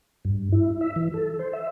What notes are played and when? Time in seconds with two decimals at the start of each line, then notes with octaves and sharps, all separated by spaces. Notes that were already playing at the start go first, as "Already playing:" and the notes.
0.25 G2
0.52 E4
0.81 E5
0.96 E3
1.14 A4
1.39 C5
1.53 E5